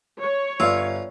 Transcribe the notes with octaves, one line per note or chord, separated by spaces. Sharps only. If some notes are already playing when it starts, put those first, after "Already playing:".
C#5
G1 F4 D5 F5 E6